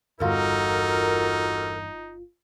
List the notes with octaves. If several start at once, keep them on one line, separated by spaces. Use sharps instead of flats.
G1 E2 G2 D#4 F4 F#4 A4 A#4